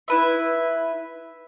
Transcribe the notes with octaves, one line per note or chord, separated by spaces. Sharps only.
E4 B4 E5